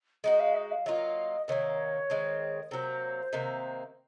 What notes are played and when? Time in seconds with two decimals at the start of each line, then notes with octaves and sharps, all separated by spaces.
0.24 G#3 D#4 F#4 D#5
0.40 F5
0.55 D#5
0.71 F5
0.86 F#3 A#3 F4 D#5
1.48 C3 D#3 A#3 C#5
2.10 D#3 G#3 C4
2.71 C3 F#3 A#3 C5
3.33 C3 D#3 A#3